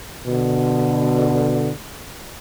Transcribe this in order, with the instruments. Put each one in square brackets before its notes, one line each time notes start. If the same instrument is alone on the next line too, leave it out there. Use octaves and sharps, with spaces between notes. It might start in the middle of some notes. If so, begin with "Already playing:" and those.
[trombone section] B2 D3